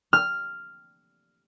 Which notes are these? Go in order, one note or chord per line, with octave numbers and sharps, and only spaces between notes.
F6